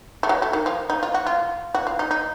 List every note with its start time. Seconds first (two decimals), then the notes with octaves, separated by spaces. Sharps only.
0.23 A3
0.29 F#3
0.42 A3
0.53 D#3
0.66 F3
0.90 D#4
1.03 F4
1.14 F#4
1.26 F4
1.75 F#4
1.87 F4
1.99 D#4
2.11 D#4